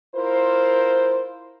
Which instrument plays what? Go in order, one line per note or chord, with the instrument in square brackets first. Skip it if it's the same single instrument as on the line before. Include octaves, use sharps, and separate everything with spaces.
[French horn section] E4 F4 A#4 C5